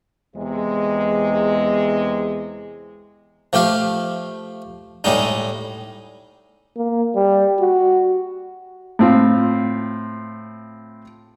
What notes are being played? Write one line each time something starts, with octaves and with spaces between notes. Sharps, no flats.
E2 C3 G#3
F3 A3 G4 F5
A2 G3 G#3 D#4
A#3
G3
F#4
A2 C4 F4